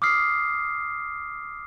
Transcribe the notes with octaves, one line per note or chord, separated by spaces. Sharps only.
D6 D#6 F6 C7